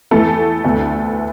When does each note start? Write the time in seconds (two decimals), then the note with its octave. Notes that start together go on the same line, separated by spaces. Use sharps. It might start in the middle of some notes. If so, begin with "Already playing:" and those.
0.11 E2 E3 A3 B3 A4
0.64 D2 D3 B3